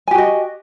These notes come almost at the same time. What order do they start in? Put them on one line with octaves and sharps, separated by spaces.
G#5 G4 F#4 D#5